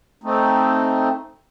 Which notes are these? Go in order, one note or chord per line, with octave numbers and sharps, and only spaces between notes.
A3 C4 D#4